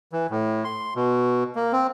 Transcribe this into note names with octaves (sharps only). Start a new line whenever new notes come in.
E3
A2
C6
B2
A#3
C4